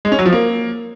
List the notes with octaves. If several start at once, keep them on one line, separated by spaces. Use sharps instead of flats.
G#3
C#4
F#3
F3
A#3